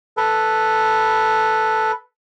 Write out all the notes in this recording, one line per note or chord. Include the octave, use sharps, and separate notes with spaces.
A4 B4